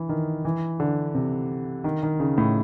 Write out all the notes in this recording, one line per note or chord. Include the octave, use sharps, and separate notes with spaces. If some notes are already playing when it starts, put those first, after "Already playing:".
Already playing: E3
D#3
E3
D3
C3
D#3
D#3
C#3
A2